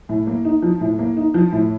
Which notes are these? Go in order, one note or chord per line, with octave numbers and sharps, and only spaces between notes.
A2
A#3
D#4
F3
A2
A#3
D#4
F3
A2